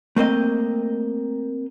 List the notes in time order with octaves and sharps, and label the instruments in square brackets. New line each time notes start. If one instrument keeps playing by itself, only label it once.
[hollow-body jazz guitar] A3 A#3 C4 D#5